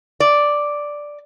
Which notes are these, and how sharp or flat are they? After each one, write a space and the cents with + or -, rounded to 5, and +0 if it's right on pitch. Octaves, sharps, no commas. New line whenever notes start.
D5 +0